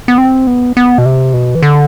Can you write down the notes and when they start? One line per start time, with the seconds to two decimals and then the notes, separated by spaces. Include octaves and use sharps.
0.08 B3
0.18 C4
0.47 B3
0.77 B3
0.98 B2
1.06 C3
1.34 B2
1.55 E3
1.62 D3